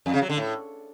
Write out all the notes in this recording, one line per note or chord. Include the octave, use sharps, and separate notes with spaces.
F2
C#3
F#3
D3
A2